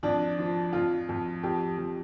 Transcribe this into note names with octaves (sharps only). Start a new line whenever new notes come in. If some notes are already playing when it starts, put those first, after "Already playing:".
F2 D4 D5
F3
F2 F4
F2
F2 G4
F2